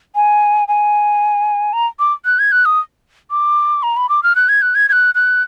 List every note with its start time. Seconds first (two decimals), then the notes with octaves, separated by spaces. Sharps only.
0.15 G#5
0.68 G#5
1.73 A#5
1.99 D6
2.25 F#6
2.39 G#6
2.52 F#6
2.65 D#6
3.31 D6
3.83 A#5
3.97 B5
4.09 D6
4.23 F6
4.35 F#6
4.49 G#6
4.62 F#6
4.75 G#6
4.89 G#6
4.92 F#6
5.15 F#6